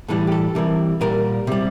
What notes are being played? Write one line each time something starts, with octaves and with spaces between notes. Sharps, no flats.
A2 E3 G3 A4
G4
A4
C3 E3 G3 A#4
A#2 G3 A#4
C3 G3